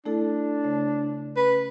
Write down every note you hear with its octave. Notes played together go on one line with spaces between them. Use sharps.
A3 D4 E4 A4
C#3 A3
C#4 B4